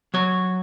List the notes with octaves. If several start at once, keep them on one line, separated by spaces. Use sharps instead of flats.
F#3 C#5